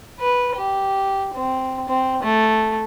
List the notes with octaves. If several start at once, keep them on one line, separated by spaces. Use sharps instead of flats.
B4
G4
C4
C4
A3